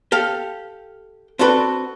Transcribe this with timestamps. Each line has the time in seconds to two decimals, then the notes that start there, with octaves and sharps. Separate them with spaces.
0.12 G4 A4 F5
1.39 C4 D4 F#4 A4 B4